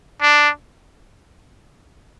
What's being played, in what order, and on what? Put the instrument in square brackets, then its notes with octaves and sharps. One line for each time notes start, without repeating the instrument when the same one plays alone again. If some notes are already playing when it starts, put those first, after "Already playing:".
[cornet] D4